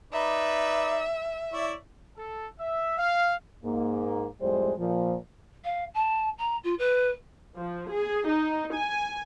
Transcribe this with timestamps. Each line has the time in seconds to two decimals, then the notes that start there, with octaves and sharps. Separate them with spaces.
0.13 D#4 B4 D5 E5
1.53 E4 C#5 D5
2.17 A4
2.59 E5
2.98 F5
3.64 G#2 A#3
4.42 F2 A2 G3 G#3 C5
4.79 A#2 F3
5.64 F5
5.94 A5
6.38 A#5
6.63 F4
6.79 B4
7.57 F3
7.91 G#4
8.27 D#4
8.76 G#5